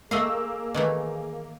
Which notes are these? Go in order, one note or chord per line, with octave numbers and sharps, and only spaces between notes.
A3 A#3 G#4 D#5 F5 E6
D#3 E3 A3